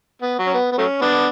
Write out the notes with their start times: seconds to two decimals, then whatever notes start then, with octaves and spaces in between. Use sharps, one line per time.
0.22 B3
0.39 F#3
0.46 C#4
0.54 B3
0.72 B3
0.78 F#3 A3 C#4
1.01 B3 D4